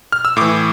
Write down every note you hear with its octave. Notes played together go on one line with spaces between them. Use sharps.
F6
E6
A2 E3 D6